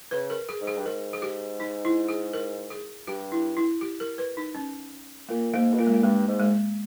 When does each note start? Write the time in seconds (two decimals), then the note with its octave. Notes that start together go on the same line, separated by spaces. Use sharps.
0.11 C#3 B4
0.30 A#4
0.49 G#4
0.61 G#2
0.67 G#4
0.77 G2
0.85 G#2 A#4
1.13 G#4
1.22 G4
1.60 D#4
1.85 E4
2.09 G#4
2.34 A#4
2.70 G#4
3.07 G2 G4
3.32 E4
3.57 E4
3.81 G4
4.00 A#4
4.18 B4
4.37 D#4
4.55 C#4
5.29 A#2 A#3
5.54 G#2 A#3
5.74 B2
5.79 A#2 A#3
5.87 G#3
5.94 A#3
6.03 G2 G#3
6.27 G#2
6.40 G#3